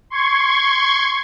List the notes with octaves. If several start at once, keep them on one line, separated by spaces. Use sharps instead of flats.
C6 C#6 G#6